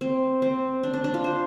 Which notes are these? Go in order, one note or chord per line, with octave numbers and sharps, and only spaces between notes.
C4
C4
D4
D4
D4
F4
C5